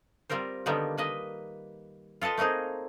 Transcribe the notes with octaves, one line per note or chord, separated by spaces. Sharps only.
G3 C4 F4 A#4 C5
D3 D#3 G3 A#3 B3
A#3 B4 D#5
F4 A4 B4 D#5 E5
A3 A#3 C4 D#4 G#4